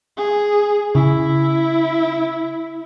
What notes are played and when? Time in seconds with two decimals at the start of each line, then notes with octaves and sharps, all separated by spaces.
0.17 G#4
0.95 C#3 E4